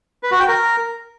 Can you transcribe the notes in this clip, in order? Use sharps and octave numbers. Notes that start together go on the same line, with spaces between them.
B4
F#4
G5
A#4